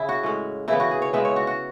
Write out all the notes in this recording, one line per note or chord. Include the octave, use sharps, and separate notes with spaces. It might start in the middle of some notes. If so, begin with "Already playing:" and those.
Already playing: C#3 E4 G#4
F#4
A2 G#3 C#4
C#3 E3 B3 E4
F#4
G#4
C#5
C#3 G#3 B3 E5
C#5
F#4
F#4